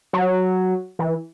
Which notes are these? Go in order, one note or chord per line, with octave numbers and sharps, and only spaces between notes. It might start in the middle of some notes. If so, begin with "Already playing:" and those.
F#3
E3